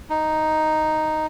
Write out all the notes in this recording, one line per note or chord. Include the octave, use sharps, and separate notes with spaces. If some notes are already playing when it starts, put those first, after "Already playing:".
D#4